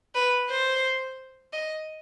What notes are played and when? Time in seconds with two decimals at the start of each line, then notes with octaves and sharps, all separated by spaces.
0.15 B4
0.50 C5
1.53 D#5